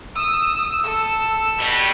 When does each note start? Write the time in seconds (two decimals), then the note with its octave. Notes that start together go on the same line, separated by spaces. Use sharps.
0.16 D#6 E6
0.83 A4
1.59 B2 G3